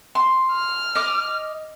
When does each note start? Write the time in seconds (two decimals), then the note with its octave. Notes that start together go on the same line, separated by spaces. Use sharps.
0.15 C6
0.52 F6
0.95 D#5 D6